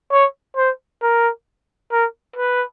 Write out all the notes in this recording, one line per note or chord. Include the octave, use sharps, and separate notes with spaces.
C#5
C5
A#4
A#4
B4